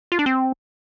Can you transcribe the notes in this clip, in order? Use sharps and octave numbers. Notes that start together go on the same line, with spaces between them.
F4
D4
C4